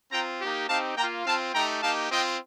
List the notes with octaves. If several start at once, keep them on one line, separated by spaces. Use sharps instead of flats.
C4 F4 G5 A#5
A#3 D#4 G4
C4 D#4 G4 F5 A5
A#3 F4 G5 A#5
C4 F4 F5 A5
A3 D#4 G4 G5 A#5
A#3 D#4 G4 F5 A5
C4 F4 D#5 G5